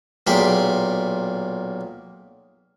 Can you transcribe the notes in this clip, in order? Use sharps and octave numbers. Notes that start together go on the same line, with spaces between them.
B1 A#2 G#4 G5 B5